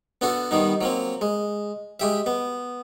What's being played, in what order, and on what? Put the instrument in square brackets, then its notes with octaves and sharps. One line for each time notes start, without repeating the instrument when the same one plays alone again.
[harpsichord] B3 D4 F#4 A4
D#3 G3 B3 D#4
F#3 A#3 C4
G#3
G#3 G4 E5
B3